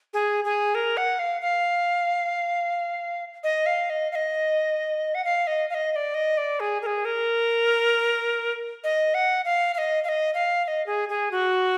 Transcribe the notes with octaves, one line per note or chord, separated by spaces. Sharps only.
G#4
G#4
A#4
F#5
F5
F5
D#5
F5
D#5
F5
D#5
F#5
F5
D#5
F5
D#5
D#5
D5
D#5
D5
G#4
A#4
G#4
A#4
D#5
F#5
F5
F5
D#5
F5
D#5
F5
F5
D#5
G#4
G#4
F#4